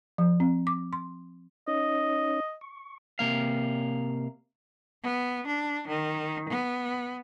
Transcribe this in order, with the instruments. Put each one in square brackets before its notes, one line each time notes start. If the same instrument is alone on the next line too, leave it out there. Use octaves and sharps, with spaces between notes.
[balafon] F3
C4
D6
C6
[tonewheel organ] C#4 D#4 C#5 [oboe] D#5
[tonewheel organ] C#6
[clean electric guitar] C3 A#3 F5
[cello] B3
D4
D#3
B3